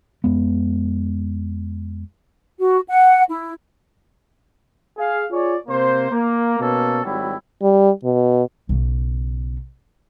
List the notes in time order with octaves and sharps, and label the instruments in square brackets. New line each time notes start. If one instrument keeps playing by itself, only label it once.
[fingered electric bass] F2 G#3 B3
[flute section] F#4
F#5
E4
[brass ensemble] G#4 F5
F4 G#4 C#5 D5
C3 A#3 C5
A#3
B2 A#3 C#4 A4
G#1 F#3 G3 E4
[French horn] G3
B2
[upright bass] B1 C#3